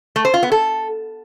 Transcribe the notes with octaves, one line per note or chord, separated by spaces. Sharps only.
A3
C5
F4
B3
A4